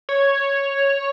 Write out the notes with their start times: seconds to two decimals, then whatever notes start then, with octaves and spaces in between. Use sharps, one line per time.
0.09 C#5